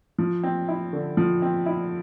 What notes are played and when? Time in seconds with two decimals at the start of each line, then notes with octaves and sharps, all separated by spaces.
0.19 F3
0.43 C4
0.68 E4
0.93 D3
1.17 F3
1.42 C4
1.66 E4